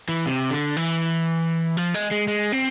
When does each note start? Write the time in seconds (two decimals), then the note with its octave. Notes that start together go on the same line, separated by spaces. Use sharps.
0.09 E3
0.26 C3
0.50 D3
0.77 E3
1.77 F3
1.94 G#3
2.11 G#3
2.28 G#3
2.52 C4